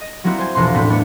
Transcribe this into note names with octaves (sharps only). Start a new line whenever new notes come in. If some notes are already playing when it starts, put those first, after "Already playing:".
D#5
F#3 G3 A#3 C4 E4 F#4
C5 G#5 G#6
E1 A#1 B2 C6
A2 B3 C4 D4 B6
A3 B3 D4 C#5